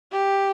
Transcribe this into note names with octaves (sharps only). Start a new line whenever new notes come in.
G4